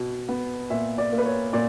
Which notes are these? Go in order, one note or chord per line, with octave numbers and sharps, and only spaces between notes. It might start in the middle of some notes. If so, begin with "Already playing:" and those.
Already playing: B2
B3
A#2 E5
D5
A#3
B4
C#5
A#2 D5